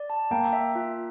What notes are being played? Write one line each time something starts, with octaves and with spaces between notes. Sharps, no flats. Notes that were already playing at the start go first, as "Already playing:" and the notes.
Already playing: D5
A5
A#3 G5
E5
F4